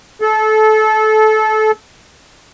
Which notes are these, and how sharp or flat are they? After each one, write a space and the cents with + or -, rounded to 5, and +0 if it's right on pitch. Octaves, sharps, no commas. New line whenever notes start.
A4 -25